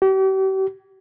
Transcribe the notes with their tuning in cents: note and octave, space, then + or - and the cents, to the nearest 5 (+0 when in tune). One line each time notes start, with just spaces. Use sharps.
G4 -40